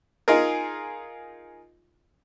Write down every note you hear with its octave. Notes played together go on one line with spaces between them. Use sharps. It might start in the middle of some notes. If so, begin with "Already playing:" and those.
D#4 F4 G#4 A#4